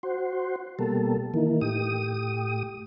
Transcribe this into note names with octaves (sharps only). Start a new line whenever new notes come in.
F#4 C5
B2 G3 A#3 A4
D#3 E3 A#3
A2 G4 D#6